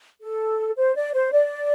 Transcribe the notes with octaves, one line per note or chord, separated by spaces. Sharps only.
A4
C5
D5
C5
D5